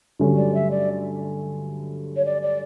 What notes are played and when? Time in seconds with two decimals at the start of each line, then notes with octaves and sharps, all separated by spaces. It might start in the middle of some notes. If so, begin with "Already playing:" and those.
0.19 G2 D3 F#3 A3 C#4
0.37 D5
0.54 E5
0.71 D5
2.16 C#5
2.25 D5
2.42 D5